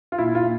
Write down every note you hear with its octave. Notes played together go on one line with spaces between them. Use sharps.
F4
A#2 E4
F4
A#2